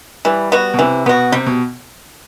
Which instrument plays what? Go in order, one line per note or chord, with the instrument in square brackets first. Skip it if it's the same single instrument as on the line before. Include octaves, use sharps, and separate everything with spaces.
[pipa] E3 [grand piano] G3
[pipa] B3 F#4
[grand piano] B2
[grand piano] C3 [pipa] E3
[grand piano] B2 [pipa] B3 F#4
[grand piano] C3 [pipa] G3
[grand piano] B2